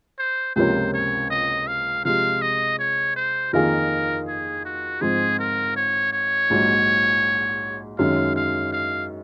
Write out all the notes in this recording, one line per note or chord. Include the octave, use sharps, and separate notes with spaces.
C5
C#2 C3 F3 A#3 C#4 C5
C#5
D#5
F5
C3 F3 G#3 F5
D#5
C#5
C5
F2 D#3 A#3 F4 G#4 A#4
G#4
F#4
G#2 F3 C4 G#4
A#4
C#5
C#5
A#1 G#2 F#3
F#2 D#3 G#3 C#4 F5
F5
F5